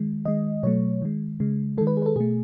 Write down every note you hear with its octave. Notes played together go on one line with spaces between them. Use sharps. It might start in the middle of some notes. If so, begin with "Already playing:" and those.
Already playing: D#3 G#3
D#3 G#3 D#5
B2 F#3 A3 C#5
D#3 G#3
C#3 G#3
D#3 G#3 A4
B4
G#4
B4
A4
B2 A3 G#4